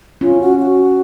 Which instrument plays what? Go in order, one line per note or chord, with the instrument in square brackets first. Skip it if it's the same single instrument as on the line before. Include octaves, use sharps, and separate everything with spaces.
[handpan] C#4 [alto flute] F4
[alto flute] F#4
F#4